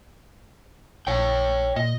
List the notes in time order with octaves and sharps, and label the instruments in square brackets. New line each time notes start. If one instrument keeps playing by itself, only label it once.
[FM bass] A#1 [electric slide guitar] C#5 G5
[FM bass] A#2 [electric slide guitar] D#5